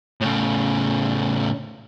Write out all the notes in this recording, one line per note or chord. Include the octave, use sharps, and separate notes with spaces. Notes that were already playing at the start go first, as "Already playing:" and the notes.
A2 C#3